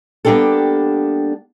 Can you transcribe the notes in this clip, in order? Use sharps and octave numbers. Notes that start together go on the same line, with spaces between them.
G3 A#3 B3 D4 G4 A4